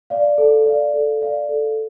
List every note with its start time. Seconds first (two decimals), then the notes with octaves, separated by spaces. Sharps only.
0.10 D5 F5
0.38 A4
0.66 D5 F5
0.94 A4
1.21 D5 F5
1.49 A4